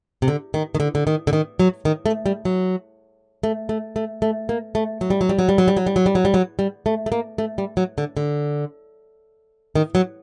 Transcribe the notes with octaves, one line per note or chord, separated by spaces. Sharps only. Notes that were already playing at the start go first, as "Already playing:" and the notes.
C3
D3
D#3
D#3
D3
D3
D#3
D3
D#3
F#3
D#3
A3
G3
F#3
A3
A3
A3
A3
A#3
A3
F#3
G3
F#3
G3
F#3
G3
F#3
G3
F#3
G3
F#3
G3
F#3
G3
F#3
G3
A3
A3
A#3
A3
G3
F#3
D3
D3
D#3
F#3